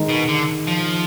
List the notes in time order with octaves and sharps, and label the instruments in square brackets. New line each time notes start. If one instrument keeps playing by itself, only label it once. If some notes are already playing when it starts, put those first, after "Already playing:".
Already playing: [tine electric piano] D#3 G#3 D#4
[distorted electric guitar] B2
D3
F3